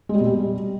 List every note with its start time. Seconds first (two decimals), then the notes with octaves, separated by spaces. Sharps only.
0.09 G#3
0.15 G3
0.20 B2
0.25 G3